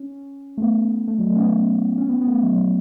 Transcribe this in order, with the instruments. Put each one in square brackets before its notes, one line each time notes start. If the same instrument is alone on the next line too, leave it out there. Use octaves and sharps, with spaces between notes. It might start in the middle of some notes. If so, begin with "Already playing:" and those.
Already playing: [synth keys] C#4
A3
B3
A3
F#3
A3
C#4
B3
C#4
B3
B3
A3
B3
F#3
F#3